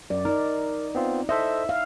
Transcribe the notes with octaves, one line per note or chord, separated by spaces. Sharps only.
F#2 D5
D#4 A#4 D5
B3 C4 F4
A4 C5 D#5 E5
F5